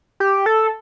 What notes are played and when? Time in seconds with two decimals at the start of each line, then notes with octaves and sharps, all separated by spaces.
0.20 G4
0.46 A4